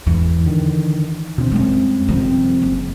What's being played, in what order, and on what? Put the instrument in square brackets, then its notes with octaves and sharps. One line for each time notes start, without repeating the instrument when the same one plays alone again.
[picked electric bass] E2 G#2 [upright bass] E3
[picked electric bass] D3 D#3
B2 D3 C4
[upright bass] F#2 G3 [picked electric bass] G#3 B3 C4
[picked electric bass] C3 F3 C4 [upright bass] D#3 G3
[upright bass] F#1